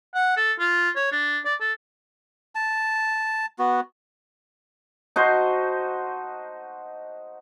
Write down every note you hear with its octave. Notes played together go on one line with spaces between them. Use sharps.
F#5
A4
F4
C#5
D4
D5
A4
A5
B3 F#4
D#4 F#4 C5 A5